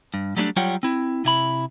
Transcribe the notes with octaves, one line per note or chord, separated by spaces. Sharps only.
G2
F#3 G3 A3 C#4 D4
F#3 G3 F4 C#5 F#5 G5
C4 E4
C3 E4 B5